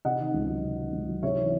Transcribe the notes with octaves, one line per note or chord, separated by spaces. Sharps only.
C3 D#5 F#5
D#3
C#2
F#3
C3
D#3
C#2
F#3
C3 C#5 E5
E3